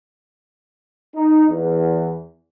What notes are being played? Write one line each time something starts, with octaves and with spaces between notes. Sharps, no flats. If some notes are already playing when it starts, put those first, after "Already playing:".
D#4
E2